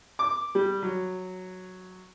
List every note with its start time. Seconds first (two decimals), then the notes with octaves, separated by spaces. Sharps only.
0.19 D6
0.55 G3
0.82 F#3